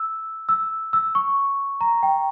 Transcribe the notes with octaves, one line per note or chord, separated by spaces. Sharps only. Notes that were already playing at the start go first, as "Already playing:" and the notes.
Already playing: E6
E6
E6
C#6
A#5
G5